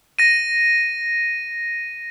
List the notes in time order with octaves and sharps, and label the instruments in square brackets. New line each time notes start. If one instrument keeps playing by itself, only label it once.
[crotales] A#6 D#7